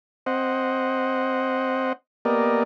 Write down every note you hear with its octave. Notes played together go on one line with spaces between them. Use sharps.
C4 C5 D#5 F#5
A#3 B3 G4 A#4 D5 D#5